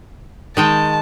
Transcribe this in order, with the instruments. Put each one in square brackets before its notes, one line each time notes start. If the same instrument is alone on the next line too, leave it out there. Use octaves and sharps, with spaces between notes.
[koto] D#3 G#3 G5 [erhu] A5